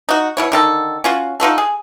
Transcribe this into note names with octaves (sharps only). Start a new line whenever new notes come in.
D#4 F#4
B2 E4 C#5
D3 D#3 A4
C#4 F4 F#4
D#4 F4 F#4 A4
G#4